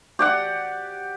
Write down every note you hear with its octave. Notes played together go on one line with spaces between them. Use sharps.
G4 D5 F#5